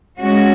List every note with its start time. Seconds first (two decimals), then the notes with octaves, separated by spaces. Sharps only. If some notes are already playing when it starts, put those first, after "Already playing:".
0.19 G#3 C#4 F#4